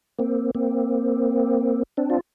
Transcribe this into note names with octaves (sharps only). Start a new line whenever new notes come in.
A#3 C4
A#3 C4
C4 D4
F4